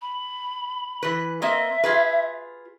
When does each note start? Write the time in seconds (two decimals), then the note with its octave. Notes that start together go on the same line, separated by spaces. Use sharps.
0.02 B5
1.03 E3 B4
1.42 A#3 C4 D#5 E5
1.84 F4 G#4 B4